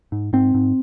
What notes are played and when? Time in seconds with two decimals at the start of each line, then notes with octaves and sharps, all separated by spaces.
0.12 G#2
0.33 G#2 C4
0.54 G#2